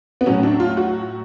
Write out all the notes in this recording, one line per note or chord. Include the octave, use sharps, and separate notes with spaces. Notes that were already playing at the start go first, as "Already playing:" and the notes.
B3
A2 F#3 C#4
D4
F4
F#4